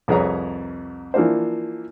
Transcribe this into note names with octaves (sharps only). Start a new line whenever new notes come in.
C2 F2 G#4 B4 C#5 A#5
E3 F3 A#3 D4 C5